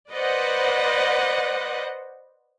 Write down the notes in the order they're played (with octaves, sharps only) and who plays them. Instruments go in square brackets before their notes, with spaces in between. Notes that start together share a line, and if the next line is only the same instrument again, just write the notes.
[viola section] B4 C5 D5 D#5 F#5